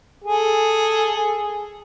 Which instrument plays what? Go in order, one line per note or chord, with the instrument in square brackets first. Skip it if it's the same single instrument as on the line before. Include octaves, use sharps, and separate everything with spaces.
[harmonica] G#4 A4